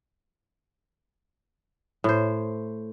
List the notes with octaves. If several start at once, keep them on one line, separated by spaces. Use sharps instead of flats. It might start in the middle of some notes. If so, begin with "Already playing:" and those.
A2 C5